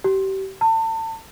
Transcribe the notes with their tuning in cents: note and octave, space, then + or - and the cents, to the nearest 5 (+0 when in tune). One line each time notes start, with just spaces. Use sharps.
G4 -30
A5 +35